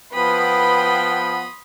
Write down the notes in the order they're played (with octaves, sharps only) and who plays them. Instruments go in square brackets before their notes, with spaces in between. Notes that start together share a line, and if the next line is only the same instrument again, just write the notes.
[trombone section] F3 B3 [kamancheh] B4 G5 [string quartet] B5 C6 D#6